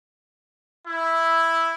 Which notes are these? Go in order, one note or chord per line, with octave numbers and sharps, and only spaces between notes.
E4